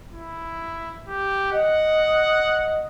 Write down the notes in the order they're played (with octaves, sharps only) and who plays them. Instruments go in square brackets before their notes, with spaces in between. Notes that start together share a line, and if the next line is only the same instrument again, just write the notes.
[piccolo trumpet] E4
G4
[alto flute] D#5 [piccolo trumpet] F#5